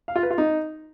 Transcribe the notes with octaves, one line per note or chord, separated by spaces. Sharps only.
F5
F4
B4
F4
D#4